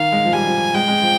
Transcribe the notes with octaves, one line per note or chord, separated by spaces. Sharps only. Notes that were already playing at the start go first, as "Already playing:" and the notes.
Already playing: D#3 F5
G#3
F3
G3 G#5
F3
G#3 G5
G#3
F3